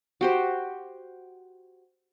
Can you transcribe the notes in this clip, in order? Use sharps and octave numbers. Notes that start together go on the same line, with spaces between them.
F#4 G4 C5